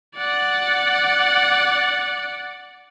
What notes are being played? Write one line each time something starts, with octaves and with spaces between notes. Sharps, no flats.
D5 F#5